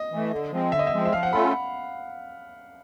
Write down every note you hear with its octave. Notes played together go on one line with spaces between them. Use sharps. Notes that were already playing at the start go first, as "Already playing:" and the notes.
Already playing: D#5
E3 A3
D3
F3 G#3 C4
D3 E5
D#5
E5
F3 G#3 C4
E5
F3 F5
F#5
A3 C#4 F4 A4 B5